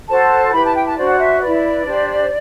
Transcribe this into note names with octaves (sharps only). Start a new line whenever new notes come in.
F#4 A4 C5 A5
E4 G4 B4 B5
A5
G5
A5
D4 F#4 C5 D5
F#5
E5
E4 B4 D5
D4 G4 C5